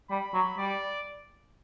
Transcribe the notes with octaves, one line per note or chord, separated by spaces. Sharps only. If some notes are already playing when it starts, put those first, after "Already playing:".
G3 B5
F#3
G3 D5